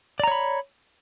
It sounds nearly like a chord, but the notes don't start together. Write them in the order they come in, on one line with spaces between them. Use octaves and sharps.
D5 A#5 C#5 B5